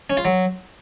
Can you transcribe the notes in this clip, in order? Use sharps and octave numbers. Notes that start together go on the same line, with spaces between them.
C#4
F4
F#3